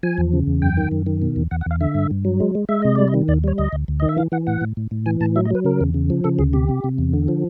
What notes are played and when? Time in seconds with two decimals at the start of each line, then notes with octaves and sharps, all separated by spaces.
0.03 F3 G#5
0.18 E2
0.33 C#3
0.47 E2
0.62 F#2 G5
0.77 D#3
0.92 F#2
1.06 D#3
1.22 B2
1.36 E2
1.51 E2 F#5
1.61 F#5
1.66 E2 F5
1.80 D3 E5
1.95 G2
2.11 G2
2.25 F#3
2.40 G#3
2.55 G#3
2.69 G#3 E5
2.82 C3 D#5
2.95 G3 D5
3.08 D#5
3.14 D#3
3.28 D#2 D5
3.44 G3 C#5
3.58 D2 D#5
3.73 D2
3.88 D2
4.00 D#3 D#5
4.09 E5
4.17 E3 F5
4.32 E3 F#5
4.47 A2 F#5
4.61 A2
4.77 A2
4.91 A2
5.06 E3 G#5
5.20 A2 A5
5.36 F#3 E5
5.45 D#5
5.51 F#3 B4
5.65 C#3 A#4
5.81 E2
5.94 C#3
6.10 F3
6.24 C#3 A4
6.39 D2 G#4
6.53 C3 G4
6.69 C3
6.84 C3
6.98 E2
7.14 D3
7.28 F3